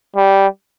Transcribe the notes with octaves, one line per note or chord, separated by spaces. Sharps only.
G3